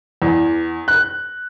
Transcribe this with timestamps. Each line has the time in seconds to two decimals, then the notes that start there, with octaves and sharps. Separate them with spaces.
0.22 E2
0.88 F#6